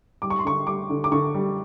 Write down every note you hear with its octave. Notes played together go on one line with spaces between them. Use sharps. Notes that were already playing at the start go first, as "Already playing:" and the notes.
G3 D6
C#6
C6
D3 C#6
G3 D6
D3
D6
D3 C#6
G3